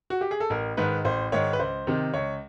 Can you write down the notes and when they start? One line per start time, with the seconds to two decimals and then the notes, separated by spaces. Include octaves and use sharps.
0.10 F#4
0.21 G4
0.31 G#4
0.40 A4
0.50 A1 A#4
0.77 G#2 D#3 B4
1.05 A1 C5
1.32 G#2 D#3 C#5
1.53 B4
1.59 C#2 C5
1.87 C3 D#3
2.14 C#2 C#5